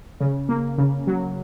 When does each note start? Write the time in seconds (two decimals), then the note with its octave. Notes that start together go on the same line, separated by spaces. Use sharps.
0.20 C#3
0.49 A#3
0.78 C#3
1.07 F#3